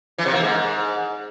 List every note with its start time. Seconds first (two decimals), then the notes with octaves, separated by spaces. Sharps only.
0.18 E3
0.26 C3
0.33 A#3
0.40 G#2